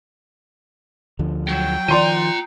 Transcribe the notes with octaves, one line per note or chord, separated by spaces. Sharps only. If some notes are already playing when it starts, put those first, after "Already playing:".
D2 D3 F3
F#3 G5
D#3 F3 F4 D5 A#5 C6 D#7